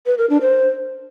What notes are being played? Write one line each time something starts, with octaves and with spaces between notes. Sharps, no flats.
B4
A#4
D4
C5